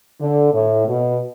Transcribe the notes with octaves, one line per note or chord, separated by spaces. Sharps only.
D3
A2
B2